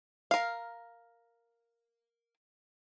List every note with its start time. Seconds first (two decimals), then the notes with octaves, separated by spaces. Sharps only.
0.31 A#4 F5